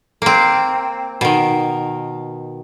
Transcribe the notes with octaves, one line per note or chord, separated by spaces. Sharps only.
A#3 C4
B2 D#3